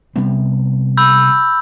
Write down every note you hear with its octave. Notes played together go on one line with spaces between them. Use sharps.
C3 G3 B3
B5 E6 G6